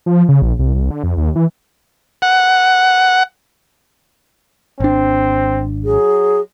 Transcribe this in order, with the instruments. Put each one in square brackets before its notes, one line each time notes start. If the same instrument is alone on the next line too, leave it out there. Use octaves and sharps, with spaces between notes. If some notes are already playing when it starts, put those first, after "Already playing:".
[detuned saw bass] F3
C#3
A#1
C2
C2
D3
F2
D#2
E3
[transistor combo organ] F#5
[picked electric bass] G#1 D4 [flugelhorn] C4
[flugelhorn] F#3 [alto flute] G#4